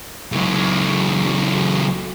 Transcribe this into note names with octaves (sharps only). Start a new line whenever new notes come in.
C#2 F#3